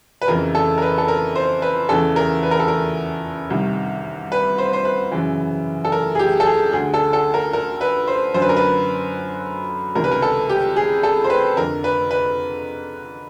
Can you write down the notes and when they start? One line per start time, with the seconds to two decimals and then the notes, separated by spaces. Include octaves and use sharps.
0.22 B4
0.28 F2 C#3 E3 A#4
0.55 A4
0.78 A#4
0.82 B4
0.98 A4
1.08 A#4
1.35 C5
1.62 B4
1.89 E2 C#3 E3 A4
2.16 A#4
2.43 B4
2.51 A#4
2.59 A4
2.68 A#4
3.50 C2 C3 D#3
4.32 B4
4.58 C5
4.73 C5
4.85 B4
5.12 F#2 C#3 E3
5.85 A4
5.92 A#4
6.15 G#4
6.19 G4
6.40 A4
6.46 G#4
6.73 D2 D3 G#4
6.94 A4
7.13 A4
7.34 A#4
7.53 A#4
7.81 B4
8.07 C5
8.34 F#2 D3 C5
8.42 B4
8.49 A#4
8.57 B4
9.95 C#2 C3 D#3 A#4
10.04 B4
10.12 A#4
10.22 A4
10.49 G4
10.76 G#4
11.03 A4
11.24 C5
11.30 B4
11.57 F2 D3 A#4
11.84 B4
12.11 B4